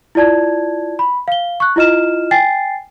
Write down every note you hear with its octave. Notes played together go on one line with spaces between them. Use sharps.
E4 F4 D5 A5 G#6
B5
F5 G7
C#6 F#6
E4 F4 D#5 F6 E7
G5 G#5 A6 C7